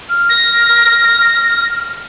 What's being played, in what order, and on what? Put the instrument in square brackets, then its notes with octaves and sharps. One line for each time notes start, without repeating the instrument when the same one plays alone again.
[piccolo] F6
[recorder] A#6